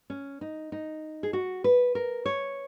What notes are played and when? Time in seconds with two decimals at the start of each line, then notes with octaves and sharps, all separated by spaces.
0.10 C#4
0.41 D#4
0.72 D#4
1.23 G#4
1.33 F#4
1.64 B4
1.95 A#4
2.26 C#5